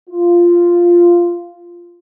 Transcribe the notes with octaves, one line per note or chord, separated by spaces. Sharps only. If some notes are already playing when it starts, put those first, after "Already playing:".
F4